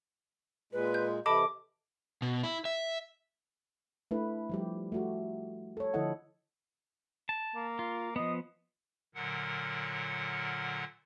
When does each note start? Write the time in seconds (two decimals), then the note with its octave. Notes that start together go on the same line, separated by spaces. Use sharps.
0.73 A#2 G#3 B4
0.94 G6
1.26 C3 E3 A4 D#5 A5 B5 D6
2.22 B2
2.44 E4
2.65 E5
4.11 A3 D4 E4 B4
4.50 F3 G3 G4
4.92 A3 F#4 G4
5.77 A4 C#5
5.94 D3 F3 E4 A4 D#5 F#5
7.29 A5
7.55 A#3
7.79 F4
8.16 F3 B3 D#5
9.15 A#2 D3 F#3 A#4 F#5